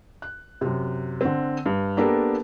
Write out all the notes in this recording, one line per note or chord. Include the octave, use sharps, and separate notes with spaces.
F#6
F#2 C3
D3 C4
G2
A#3 B3 D4 G4 A4 A#4